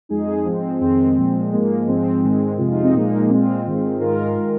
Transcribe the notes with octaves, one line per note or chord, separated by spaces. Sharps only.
F2 F3 G#3 D#4 G#4
G#2 F3 G#3 C4
F2 D#3 G#3 C4
A#2 F3 G#3
G#2 F3 G#3 A#3
G#2 F3 G#3 C4
G#2 D#3 G#3
F2 C3 G#3 F4
D#4
C4
A#2 F3 G#3 A#3 D#4
A#2 G#3 C4 F4
G#2 D#3 G#3
G#2 D#3 G#3 F4 A#4
D#3 G#3